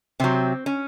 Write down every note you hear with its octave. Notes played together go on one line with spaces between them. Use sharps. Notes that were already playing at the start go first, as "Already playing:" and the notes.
C3 F#3 C4
C#4